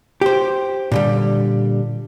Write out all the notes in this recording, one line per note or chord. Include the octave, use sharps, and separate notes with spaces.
G4 C5
A#2 D3 G3